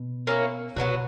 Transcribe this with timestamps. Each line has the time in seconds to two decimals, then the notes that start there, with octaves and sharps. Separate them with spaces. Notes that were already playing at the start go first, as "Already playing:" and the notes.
Already playing: B2
0.27 A#3 C#4 E4
0.76 B2 F#3 B3 D#4 F#4